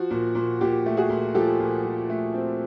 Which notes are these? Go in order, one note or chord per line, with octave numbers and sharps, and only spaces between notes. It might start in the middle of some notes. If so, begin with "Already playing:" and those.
Already playing: F3 F#4
A#2
A#2
A#2 G4
A3
F#4 G#4
A#2
F3 G4 A4
A#2
F3
A3
C4